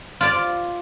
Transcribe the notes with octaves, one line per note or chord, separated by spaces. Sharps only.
F4 D5